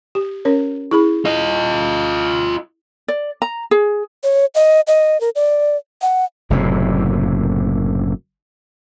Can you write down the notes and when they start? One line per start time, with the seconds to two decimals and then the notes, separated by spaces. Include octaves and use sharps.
0.15 G4
0.45 C#4 A#4 C#5
0.91 E4 G#4 B5
1.25 F4 D#5
3.08 D5
3.42 A#5
3.71 G#4
4.23 C#5
4.55 D#5
4.87 D#5
5.21 A#4
5.36 D5
6.02 F#5
6.50 F#1 F#2 A2 C3